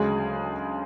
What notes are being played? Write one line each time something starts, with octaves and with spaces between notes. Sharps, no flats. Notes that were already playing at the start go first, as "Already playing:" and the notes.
Already playing: D2 C#3 F#3 G#3 G#4